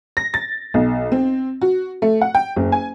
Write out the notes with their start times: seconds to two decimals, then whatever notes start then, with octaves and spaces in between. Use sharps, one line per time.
0.17 A#6
0.34 A6
0.74 B1
1.12 C4
1.62 F#4
2.02 A3
2.21 F#5
2.35 G5
2.56 F#1
2.72 G#5